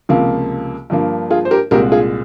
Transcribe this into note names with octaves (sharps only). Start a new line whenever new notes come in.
C#2 C3 F3 A#3
G2 F3 A#3
F4 G#4
C5
G4 A#4
C2 A#2 G#3 G4 A#4
F4 G#4